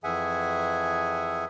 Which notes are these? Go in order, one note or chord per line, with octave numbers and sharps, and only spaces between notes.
F2 E3 G#4 E5 F#5 G#5